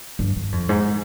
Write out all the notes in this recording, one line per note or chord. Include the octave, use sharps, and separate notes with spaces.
G2
G2
F2
G#2